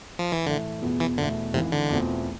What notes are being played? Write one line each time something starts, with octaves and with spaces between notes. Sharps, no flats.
F3
E3
A2 D3 E3 A3
E2 B2 B3 F4 G#4
E3
E2 B2 D3 A3
G#1 G#2 C3 E3
D3
E2 B2 A3 C4 F4